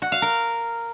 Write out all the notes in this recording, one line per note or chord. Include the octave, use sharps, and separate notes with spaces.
F#4
F5
A#4